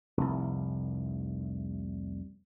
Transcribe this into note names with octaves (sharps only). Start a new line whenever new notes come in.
F1 C2